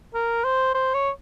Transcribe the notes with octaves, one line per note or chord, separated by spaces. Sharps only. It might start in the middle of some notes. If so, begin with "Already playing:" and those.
A#4
C5
C5
C#5